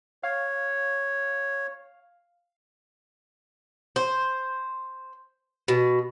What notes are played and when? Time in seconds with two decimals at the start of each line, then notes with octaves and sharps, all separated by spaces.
0.23 C#5 F5
3.96 C5
5.68 B2